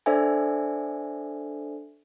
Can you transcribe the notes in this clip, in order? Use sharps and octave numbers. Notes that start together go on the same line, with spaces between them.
D4 A4 C5 D5 E5 G#5